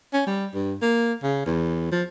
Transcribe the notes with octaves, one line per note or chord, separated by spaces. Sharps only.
C#4
G3
G2
A#3
C#3
E2
F3